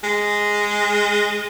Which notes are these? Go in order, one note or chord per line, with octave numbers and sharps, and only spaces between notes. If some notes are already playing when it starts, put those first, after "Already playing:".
G#3